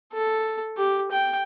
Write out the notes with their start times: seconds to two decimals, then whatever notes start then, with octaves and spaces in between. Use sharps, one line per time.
0.13 A4
0.77 G4
1.11 G5